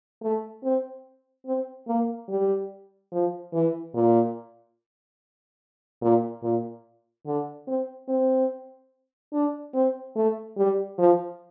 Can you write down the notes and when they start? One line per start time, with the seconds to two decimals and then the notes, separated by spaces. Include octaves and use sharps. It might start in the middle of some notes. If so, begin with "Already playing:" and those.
0.22 A3
0.64 C4
1.46 C4
1.87 A#3
2.29 G3
3.12 F3
3.53 E3
3.94 A#2
6.02 A#2
6.43 A#2
7.26 D3
7.68 C4
8.08 C4
9.33 D4
9.74 C4
10.16 A3
10.57 G3
10.98 F3